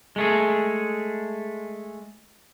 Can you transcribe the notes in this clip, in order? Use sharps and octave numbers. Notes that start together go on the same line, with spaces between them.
G#3 A3 G#4